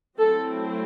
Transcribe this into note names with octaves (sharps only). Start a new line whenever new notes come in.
F#3 A3 C4 E4 A4